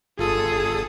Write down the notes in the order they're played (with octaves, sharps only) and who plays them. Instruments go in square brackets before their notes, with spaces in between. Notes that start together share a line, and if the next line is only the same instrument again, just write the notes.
[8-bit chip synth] G1 A4 D#6 [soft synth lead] F4 [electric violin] G#4